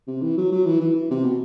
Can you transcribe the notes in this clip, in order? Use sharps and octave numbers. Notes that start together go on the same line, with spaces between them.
C3
E3
F#3
F#3
E3
E3
E3
C3
B2